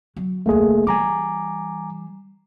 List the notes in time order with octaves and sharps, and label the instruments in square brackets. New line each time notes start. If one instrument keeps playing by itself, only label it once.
[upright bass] F#3
[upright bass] F1 D2 [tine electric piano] A3 A#3 G#4
[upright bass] E3 G3 [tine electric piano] G#5 A#5 D6